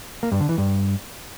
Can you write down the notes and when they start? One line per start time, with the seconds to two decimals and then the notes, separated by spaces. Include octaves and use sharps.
0.23 A#3
0.32 G2
0.40 D3
0.49 E3
0.58 G2